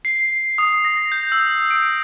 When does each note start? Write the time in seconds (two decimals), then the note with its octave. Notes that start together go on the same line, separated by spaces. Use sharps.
0.05 C7
0.58 D#6
0.85 A#6
1.12 G6
1.32 E6
1.71 D7